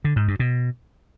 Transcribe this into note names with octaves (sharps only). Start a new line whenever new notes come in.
D3
G#2
G2
B2